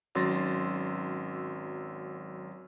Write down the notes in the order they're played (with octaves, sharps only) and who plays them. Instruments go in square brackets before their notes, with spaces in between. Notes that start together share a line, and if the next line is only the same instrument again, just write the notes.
[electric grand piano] G#1 F#3 C#4 C6 A6 A#6